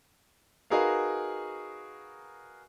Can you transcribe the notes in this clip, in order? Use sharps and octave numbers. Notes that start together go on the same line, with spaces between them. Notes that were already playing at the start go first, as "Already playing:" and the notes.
D#4 F#4 G#4 A#4 B4 F5